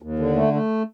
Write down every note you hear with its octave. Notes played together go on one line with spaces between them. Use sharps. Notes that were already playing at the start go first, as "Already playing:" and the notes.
D#2
D3
A3
A3